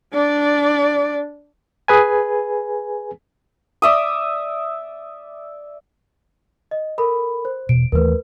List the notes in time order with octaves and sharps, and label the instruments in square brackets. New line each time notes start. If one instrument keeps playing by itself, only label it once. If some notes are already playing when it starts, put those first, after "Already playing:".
[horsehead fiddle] D4 D5
[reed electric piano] G#4 B4 G#5
[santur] D5 E5 D#6
[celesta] D#5
A4 A#4 B5
C5
[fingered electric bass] E1 B2 [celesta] D7
[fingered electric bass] D#2 E3 A3 [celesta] A#4 B4